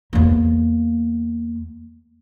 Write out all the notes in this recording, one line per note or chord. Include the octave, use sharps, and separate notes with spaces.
E2 A#3